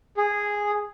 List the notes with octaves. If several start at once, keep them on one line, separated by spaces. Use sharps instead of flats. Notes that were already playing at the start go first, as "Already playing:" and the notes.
G#4